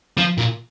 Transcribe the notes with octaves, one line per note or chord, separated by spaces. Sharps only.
F3
A#2